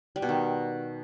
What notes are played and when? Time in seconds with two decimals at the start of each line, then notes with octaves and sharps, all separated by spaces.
0.16 G3
0.22 B2
0.29 D#3